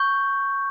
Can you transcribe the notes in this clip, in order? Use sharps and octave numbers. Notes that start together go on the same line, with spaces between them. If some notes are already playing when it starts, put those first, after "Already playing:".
Already playing: C#6 G6